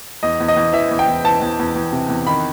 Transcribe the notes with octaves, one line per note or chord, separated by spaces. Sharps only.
E2 D#5
E2
D#5
E2
E3 E5
E2
G5
E2
E3 A5
E2
E2
E2
C3
E2
D#3 B5